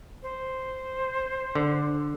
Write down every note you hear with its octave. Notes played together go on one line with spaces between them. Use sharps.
C5
D3